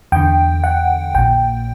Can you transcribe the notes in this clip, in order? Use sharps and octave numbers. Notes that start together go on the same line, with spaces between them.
E2 D3 G5
F#5
A#1 A#2 G5